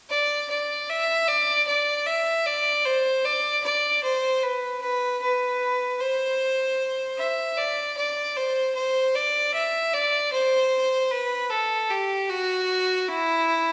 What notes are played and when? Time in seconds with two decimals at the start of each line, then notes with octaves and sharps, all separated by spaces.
0.10 D5
0.50 D5
0.89 E5
1.28 D5
1.67 D5
2.07 E5
2.46 D5
2.85 C5
3.25 D5
3.64 D5
4.04 C5
4.43 B4
4.82 B4
5.22 B4
6.00 C5
7.18 E5
7.57 D5
7.97 D5
8.36 C5
8.76 C5
9.15 D5
9.54 E5
9.93 D5
10.32 C5
11.11 B4
11.50 A4
11.90 G4
12.29 F#4
13.08 E4